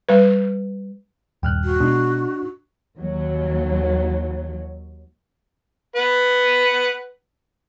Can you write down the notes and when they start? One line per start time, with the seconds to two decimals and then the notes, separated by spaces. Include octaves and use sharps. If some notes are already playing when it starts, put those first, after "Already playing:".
0.09 G3 B4
1.43 D#1 G2 G5 F6 F#6
1.64 F#4
1.80 B2 G#3 D4 D#4
2.99 D#2 F#3
5.96 B4 F#5 B5